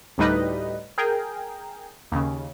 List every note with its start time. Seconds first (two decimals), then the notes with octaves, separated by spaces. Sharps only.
0.18 D2 A2 G3 D#4 B4 D#5
0.98 G#4 A#4 G5
2.12 D#2 C#3